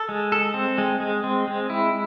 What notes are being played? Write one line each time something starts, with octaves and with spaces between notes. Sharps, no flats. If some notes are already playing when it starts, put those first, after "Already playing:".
Already playing: A4
G#3
A4
C4
G#3
G#3
C4
G#3
E4